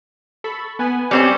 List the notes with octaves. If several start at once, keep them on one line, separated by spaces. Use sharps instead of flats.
A4 B5 C#6
B3 B4 G#5
G3 C4 C#4